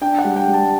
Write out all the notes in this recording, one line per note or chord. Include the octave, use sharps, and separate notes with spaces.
D4 G5
F#5
G3
G5
G3
A5